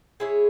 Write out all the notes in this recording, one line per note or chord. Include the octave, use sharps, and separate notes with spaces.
G#3 E4 G#4 C#5